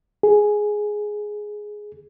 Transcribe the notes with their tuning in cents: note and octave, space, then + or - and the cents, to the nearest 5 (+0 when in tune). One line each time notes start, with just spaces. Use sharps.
G#4 +5